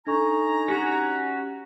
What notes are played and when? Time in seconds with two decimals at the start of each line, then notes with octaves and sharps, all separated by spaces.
0.07 D4 D#4 A4 G#5 A#5 C#6
0.68 C#4 F#4 G4